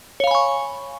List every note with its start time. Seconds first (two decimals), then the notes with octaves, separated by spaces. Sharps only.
0.20 C#5
0.24 F5
0.27 B5
0.31 G#5
0.35 C#6